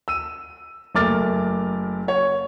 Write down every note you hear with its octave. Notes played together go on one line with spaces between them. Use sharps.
E6 D#7
F#1 A3 A#4 D6 F6 A6
C#5